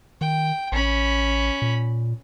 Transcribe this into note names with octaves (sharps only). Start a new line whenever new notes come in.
D#3 G5
A1 C#4 B5
A#2